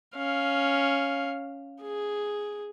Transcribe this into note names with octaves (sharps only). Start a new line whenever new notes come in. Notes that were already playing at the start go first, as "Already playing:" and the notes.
C#4 F5
G#4